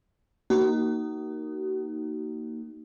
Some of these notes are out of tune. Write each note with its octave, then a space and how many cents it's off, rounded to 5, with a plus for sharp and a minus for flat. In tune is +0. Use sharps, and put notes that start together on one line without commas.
A#3 -5 D#4 +0 F#4 +40